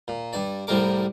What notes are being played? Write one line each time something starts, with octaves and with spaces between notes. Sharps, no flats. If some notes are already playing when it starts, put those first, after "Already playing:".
A#2
G2 D5
C2 A2 C3 G3 A#4 D6